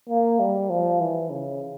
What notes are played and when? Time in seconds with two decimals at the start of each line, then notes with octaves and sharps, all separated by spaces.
0.09 A#3
0.40 G3
0.70 F3
1.01 E3
1.30 C#3